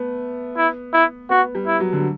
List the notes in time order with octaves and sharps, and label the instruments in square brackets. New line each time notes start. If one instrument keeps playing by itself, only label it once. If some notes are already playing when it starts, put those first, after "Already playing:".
Already playing: [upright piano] A3 B3
[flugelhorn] E4
E4
[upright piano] B3 [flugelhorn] F#4
[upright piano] G3
[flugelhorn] E4
[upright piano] F#3
D3